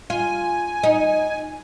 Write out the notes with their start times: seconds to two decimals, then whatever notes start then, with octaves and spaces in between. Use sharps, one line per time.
0.10 F4 G#5
0.83 D#4